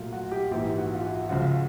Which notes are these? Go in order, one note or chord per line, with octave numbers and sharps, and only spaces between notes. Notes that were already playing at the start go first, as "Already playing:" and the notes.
Already playing: A#1 A#2 F#3 A3 F4
F#4
G4
A#1 G#2 E3 G4
F#4
F4
F#4
C#2 C#3 F3 F#4